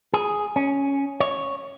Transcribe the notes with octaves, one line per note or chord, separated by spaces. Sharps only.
G#4
C#4
C#5